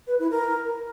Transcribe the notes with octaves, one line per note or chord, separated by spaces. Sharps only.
B4
E4
A#4